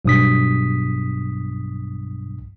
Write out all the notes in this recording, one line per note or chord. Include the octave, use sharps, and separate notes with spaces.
B1 G2 D#6 B6